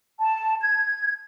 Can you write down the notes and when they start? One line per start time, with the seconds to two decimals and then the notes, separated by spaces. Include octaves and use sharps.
0.20 A5
0.62 G#6